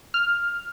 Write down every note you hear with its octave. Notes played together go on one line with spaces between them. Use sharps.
F6